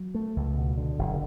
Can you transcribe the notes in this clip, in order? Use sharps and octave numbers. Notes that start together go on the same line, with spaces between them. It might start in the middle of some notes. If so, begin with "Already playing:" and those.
Already playing: F#3
A3
C#2
B2
D3
F#1